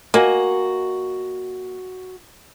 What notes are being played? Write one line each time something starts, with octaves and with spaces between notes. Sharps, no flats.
A#3 F#4 D#5 G#5